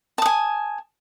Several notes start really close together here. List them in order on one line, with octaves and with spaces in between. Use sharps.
A5 D#6 G#5